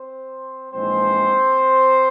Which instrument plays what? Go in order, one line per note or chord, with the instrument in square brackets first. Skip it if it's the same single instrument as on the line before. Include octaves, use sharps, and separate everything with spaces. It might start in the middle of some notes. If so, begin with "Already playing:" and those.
Already playing: [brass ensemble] C4 C5
A#1 G#2 E3 G#3 C4 C5